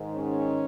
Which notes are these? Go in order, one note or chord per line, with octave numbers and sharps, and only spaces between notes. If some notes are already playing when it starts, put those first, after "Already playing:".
Already playing: G#2 D#3
C#4